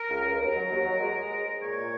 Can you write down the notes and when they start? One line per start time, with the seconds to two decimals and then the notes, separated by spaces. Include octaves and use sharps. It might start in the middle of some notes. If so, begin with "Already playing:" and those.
Already playing: A#4
0.09 C#2
0.25 C#2
0.39 D#2 A#4
0.55 F#3
0.69 D#2
0.85 F#3
1.00 G#3
1.15 G#3
1.30 G#2
1.46 G#3
1.60 A#2 C#5
1.75 A#2